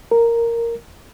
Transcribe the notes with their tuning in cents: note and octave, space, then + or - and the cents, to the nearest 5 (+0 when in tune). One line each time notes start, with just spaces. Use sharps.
A#4 -5